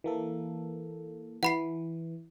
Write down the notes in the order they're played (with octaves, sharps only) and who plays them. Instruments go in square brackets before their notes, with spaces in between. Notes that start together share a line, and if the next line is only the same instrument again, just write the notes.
[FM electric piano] E3 A#3 A4
[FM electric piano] E3 [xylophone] F#5 B5 C7